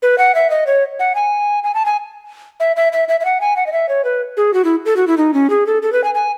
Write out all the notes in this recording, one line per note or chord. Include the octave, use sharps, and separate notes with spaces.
B4
F#5
E5
D#5
C#5
F#5
G#5
G#5
A5
G#5
E5
E5
E5
E5
E5
F#5
G#5
F#5
D#5
E5
C#5
B4
G#4
F#4
E4
A4
F#4
E4
D#4
C#4
G#4
A4
A4
B4
G#5
G#5